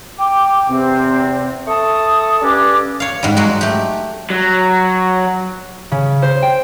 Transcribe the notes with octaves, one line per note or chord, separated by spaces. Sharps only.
G5 D6
E2 C3 C4
A4 E5 A5 C#6 D#6
G2 G3 C#4 A4 B4 D6
C#5 F5
G#2 G3
F#3 G#3 F#4
A3 G4
F#3
C#3
C5
G5